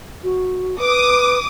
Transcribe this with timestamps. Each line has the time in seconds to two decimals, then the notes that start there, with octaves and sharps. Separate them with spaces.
0.24 F#4
0.79 B4 D6 D#6